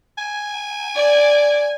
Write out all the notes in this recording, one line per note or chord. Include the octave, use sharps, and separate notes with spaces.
G#5
D5